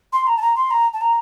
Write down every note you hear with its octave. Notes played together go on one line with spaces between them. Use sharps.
C6
A#5
A5
A#5
C6
A#5
A5
A#5